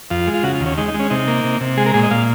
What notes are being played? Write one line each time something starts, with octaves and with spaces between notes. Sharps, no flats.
F2 F4
G#3
F4
C#3 F#4
F4
D#2
C#4
G#3 D#4
D#4
G#3
C#4
C3 D#4
A#3
C3
C3
G#3 G#4
A#4
A#2 G#4
D#5
A#2 F5